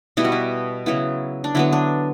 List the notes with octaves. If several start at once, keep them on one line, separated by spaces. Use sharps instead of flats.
B2 G3 B3 E4
F#4
E4
C#3 F#3 B3 E4
D4
D3 F#3 B3 E4
D4